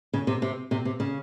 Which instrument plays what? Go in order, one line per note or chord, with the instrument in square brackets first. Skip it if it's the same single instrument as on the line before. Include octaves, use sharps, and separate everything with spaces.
[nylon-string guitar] C#3
C3
C3
C3
C3
C#3